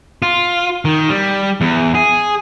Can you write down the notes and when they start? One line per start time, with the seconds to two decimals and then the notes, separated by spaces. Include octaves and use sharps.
0.22 F4
0.85 D#3
1.09 G3
1.61 E2
1.95 G#4